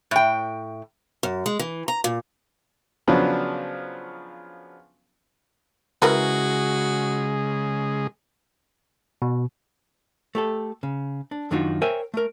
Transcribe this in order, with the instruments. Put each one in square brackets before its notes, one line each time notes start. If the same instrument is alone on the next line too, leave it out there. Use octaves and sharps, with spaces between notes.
[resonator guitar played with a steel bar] A2 G5
[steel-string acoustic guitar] F#2
G#3
E3
A#5
A#2
[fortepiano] C#3 F3 F#3 B3 D4
[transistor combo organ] C#3 G#3 G#4 [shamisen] E4 A#4 B4 [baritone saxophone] F#4
[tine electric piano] B2
[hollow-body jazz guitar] A3 G4 A4
C#3
D4
F#2 D#3 D4 D#4 F4 F#4
A#4 C5 C#5 E5 G5 G#5
A3 A#4